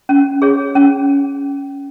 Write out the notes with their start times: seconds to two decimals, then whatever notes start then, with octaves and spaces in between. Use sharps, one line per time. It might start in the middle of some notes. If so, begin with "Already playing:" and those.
0.09 C#4
0.42 G#4 C#5
0.75 C#4